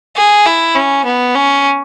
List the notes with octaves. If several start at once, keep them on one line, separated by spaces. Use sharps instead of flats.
G#4
E4
C#4
B3
C#4